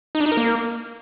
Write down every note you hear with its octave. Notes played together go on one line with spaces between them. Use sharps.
D#4
D4
D#4
A#4
A#3